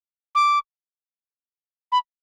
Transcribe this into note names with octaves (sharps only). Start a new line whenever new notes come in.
D6
B5